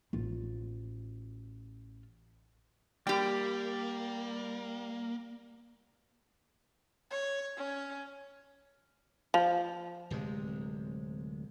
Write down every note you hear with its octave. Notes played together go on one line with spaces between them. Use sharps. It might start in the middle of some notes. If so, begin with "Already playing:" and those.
A1 F4
G3 A#3 G4 G5
C#5
C#4
F3
D1 C3 G#3